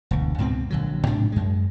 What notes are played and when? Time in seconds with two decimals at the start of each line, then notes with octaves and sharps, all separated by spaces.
0.11 E1 D2
0.38 C#2 G#2 B2 C4
0.70 A#1 D3 F#3
1.07 G#2 C3 D4
1.32 F#2 G#3